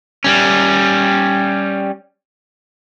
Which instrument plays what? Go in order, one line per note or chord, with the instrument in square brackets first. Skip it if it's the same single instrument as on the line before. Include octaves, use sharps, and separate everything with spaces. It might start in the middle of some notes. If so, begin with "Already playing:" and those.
[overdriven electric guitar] G3 C#4